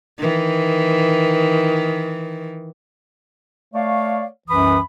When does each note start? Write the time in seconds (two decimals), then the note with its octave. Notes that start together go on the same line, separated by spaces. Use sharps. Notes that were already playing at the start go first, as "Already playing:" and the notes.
0.18 D#3 E3
3.74 A3 C#5 D5 F5
4.48 C2 F#2 E3 B5 D#6